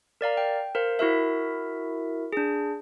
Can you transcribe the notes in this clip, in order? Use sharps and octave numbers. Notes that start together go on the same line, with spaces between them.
A#4 D5 F5 A#5
G5
A#4 C5 F5
E4 F#4 A#4 E5
D4 G#4